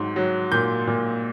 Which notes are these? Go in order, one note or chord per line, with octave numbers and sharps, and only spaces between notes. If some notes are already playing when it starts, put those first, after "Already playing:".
Already playing: G#2 F#3
F#3
A#2 G6
A#2